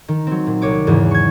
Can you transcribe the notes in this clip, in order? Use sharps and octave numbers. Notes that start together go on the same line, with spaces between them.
D#3
F#3 C4
A#2
C2 C#5 D6
E2 G#2 C#3 E3
C#6 G#6